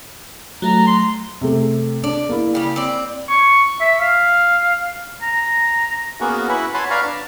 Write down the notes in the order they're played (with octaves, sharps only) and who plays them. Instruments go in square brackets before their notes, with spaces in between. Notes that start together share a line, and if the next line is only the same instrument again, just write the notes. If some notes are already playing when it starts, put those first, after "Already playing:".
[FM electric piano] F#3 A3 [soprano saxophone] A#5
[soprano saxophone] C6
[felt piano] C3 A3
[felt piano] D4 [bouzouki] D5
[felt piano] A#3 E4
[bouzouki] C#3 G3
C4 D5
[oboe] C#6
E5
F5
A#5
[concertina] A#3 B3 C#4 F#4 G#4 A#4
E4 F#4 B4 E5 F#5
C#5 F#5 G#5 A5 B5 C6
B4 D5 F5 A#5 C#6 F6
D4 A5